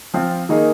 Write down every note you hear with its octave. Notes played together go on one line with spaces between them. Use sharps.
F3 C4 F4
D#3 A#3 D#4 G#4